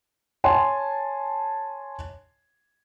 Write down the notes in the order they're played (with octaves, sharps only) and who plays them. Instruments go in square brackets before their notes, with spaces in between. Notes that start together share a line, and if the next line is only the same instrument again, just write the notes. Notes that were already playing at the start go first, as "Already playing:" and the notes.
[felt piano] C#5 G#5 A5 C6